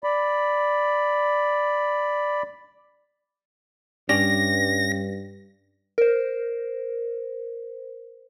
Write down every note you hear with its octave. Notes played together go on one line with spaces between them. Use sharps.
D5 B5
G2 C#4 G4 D5 A#6
A#4 C5